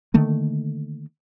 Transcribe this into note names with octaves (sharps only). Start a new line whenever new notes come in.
D3 D#3 A3 A#3